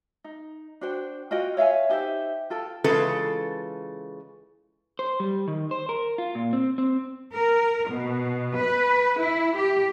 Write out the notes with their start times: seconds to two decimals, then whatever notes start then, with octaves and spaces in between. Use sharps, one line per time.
0.24 D#4
0.81 D4 F#4 C5 G5
1.31 F4 F#4 D#5 G5
1.57 C#5 E5 F5 G#5
1.89 D#4 G4 C5 E5
2.50 F4 A4 G5
2.84 C#3 E3 G#3 F4 A4 B4
4.99 C5
5.20 G3
5.48 D#3
5.71 C5
5.89 A#4
6.18 F4
6.35 A#2
6.53 C4
6.78 C4
7.31 A#4
7.89 B2
8.56 B4
9.20 E4
9.57 G4